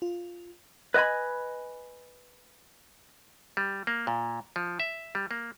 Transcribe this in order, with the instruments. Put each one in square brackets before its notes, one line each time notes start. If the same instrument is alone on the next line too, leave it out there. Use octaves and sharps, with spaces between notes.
[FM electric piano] F4
[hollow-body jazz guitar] B4 D#5 F5 G#5 B5
[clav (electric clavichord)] G3
A#3
A#2
F3
E5
G3
A#3